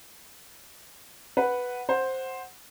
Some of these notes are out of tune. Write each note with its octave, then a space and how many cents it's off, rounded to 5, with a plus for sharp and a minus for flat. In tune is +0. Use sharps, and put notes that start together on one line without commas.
B4 +0 F#5 +0
C5 +5 F#5 +0